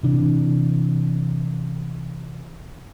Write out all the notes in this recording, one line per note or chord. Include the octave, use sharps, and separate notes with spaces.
C3 E3 D4